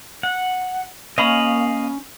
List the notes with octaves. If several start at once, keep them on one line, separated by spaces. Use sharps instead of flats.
F#5
A#3 C#4 D#5 F5 B5